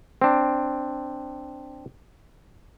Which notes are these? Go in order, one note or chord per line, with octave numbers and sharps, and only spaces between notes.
C4 D4